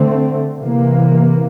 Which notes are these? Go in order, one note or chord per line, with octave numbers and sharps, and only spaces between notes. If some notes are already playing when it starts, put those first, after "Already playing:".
Already playing: D3 A3 C4
C3 E3 A#3